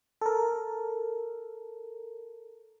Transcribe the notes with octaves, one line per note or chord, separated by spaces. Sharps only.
A4 A#4